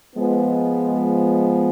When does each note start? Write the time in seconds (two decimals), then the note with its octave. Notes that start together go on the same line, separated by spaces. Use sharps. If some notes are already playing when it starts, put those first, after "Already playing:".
0.14 F3 G#3 B3